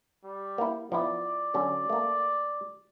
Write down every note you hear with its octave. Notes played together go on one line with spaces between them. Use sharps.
G3
A#3 E4
F3 B3 E4 D5
D3 F#3 C#4
A3 A#3